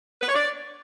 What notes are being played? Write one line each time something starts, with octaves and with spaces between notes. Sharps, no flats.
B4
C#5
D5